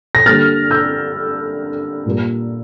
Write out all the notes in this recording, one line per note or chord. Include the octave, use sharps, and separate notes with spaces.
A#6
D3 G3 A#3 F6 A6
E6 G6
A#2 G3 A#3